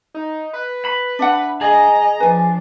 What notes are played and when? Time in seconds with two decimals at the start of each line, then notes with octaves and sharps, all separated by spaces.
0.14 D#4
0.54 B4
0.85 B5
1.19 D4 E5 F#5
1.61 G#4 D#5 A#5
2.20 F3 D4 B4 G#5